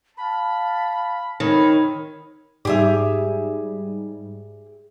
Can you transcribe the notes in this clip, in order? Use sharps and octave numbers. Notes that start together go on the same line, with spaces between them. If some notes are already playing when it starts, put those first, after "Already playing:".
F5 A5 B5
D#3 C4 C#5 B5
G#2 G3 G4 G#4 E5